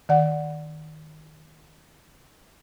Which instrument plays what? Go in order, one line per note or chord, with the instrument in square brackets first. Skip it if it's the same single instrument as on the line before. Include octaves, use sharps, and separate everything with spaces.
[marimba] D#3 D5 F#5